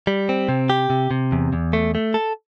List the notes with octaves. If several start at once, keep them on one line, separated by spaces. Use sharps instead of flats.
G3
C4
C3
G4
C3
C3
E2
E2
A3
A3
A4